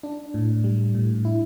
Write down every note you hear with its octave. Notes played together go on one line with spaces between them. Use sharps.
D4
A2
G3
A2
E4